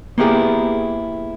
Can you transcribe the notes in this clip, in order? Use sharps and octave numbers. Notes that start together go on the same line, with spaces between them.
A#3 B3 E4 G4 G#4